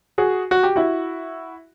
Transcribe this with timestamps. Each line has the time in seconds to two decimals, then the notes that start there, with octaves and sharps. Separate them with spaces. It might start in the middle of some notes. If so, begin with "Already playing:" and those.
0.18 F#4 G#4
0.51 F#4
0.63 G4
0.76 E4 F#4